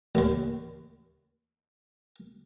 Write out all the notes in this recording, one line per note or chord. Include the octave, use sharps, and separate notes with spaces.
A1 D#2